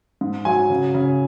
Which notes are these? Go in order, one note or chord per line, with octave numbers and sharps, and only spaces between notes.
G#2
F#3 G#5
C#3
C#3